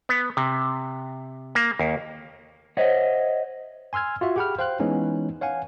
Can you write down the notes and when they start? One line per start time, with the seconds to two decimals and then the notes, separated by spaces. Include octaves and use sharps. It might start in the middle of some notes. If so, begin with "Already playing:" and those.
0.09 B3
0.37 C3
1.55 A#3
1.79 D#2
2.77 C5 C#5 D#5 E5 F#5
3.93 G#5 C6 E6 F6 G#6
4.21 F4 F#4 E5
4.36 G4 G#4 F#5 G5 B5 F6
4.59 C5 F5 G5 C6 F#6
4.80 E3 G#3 B3 C#4 D#4
5.41 C#5 F5 F#5 G#5